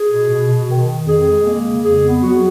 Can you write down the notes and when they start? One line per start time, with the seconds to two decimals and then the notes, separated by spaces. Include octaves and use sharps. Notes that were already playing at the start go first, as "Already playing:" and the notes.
Already playing: G#4
0.09 B2
0.29 B2
0.48 B2
0.68 D#3
0.87 D#3
1.06 F2 G#4
1.25 G#3
1.45 A#3
1.64 C#3
1.82 F2 G#4
2.02 B3
2.21 F#3 F#4